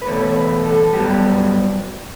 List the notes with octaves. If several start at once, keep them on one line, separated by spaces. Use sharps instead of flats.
B4
E2 B2 A3 C#5
B4
A4
G2 F#3 B3 G4